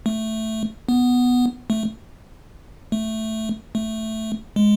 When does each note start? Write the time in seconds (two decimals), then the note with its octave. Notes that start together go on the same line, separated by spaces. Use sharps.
0.06 A3
0.89 B3
1.70 A3
2.92 A3
3.75 A3
4.56 G#3